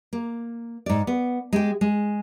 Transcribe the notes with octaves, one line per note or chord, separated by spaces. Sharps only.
A#3
G#2 D5
B3
G#3 G4 G5
G#3